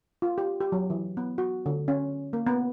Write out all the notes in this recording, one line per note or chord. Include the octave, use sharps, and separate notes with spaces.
F4
G4
G4
F#3
E3
B3
F#4
D3
C#4
A#3
B3